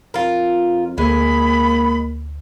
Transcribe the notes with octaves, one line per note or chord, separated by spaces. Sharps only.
F2 F4 A#4
D2 G#3 A#3 B5